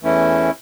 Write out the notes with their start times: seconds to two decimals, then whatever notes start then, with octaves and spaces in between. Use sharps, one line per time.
0.02 E2 E3 A3 C#4 E4